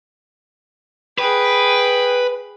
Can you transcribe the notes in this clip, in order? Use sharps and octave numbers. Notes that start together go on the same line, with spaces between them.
G#4 B4 G5